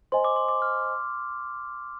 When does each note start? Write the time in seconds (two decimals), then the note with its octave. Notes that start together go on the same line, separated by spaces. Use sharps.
0.12 C5 D#5 G#5 C6
0.24 D6
0.36 C6
0.49 D6
0.62 F6